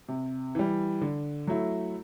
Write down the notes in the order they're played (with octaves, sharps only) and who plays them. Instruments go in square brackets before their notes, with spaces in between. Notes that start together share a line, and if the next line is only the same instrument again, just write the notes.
[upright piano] C3
E3 G3
D3
F#3 A3 E4